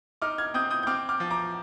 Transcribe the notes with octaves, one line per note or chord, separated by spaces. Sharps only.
D#4 D6 F6
F6 G#6
C4 D#6 G6
D#6 G6
G6
C4 D6 F6
D6 F6
F3
A#5 D6